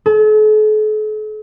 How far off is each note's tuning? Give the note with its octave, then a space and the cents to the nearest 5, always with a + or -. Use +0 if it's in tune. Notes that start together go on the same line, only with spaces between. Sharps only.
A4 -45